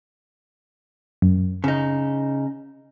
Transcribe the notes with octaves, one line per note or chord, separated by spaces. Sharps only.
F#2
C#3 D#4